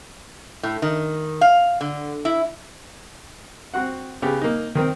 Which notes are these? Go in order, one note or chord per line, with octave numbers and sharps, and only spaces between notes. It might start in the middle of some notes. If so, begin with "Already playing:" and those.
A2
D#3
F5
D3
E4
C4 F#4 F#5
C#3 B3 G4
A#3 D#4
D#3 C4 A#4